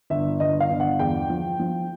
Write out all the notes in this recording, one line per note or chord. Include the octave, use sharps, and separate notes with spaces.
G1 E5
G1 D#5
F5
G1
F#5
E2 G5
F3
F3